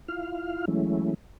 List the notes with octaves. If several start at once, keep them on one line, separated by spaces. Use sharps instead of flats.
E4 F4 F5 F6
E3 F#3 G#3 A3 C#4 E4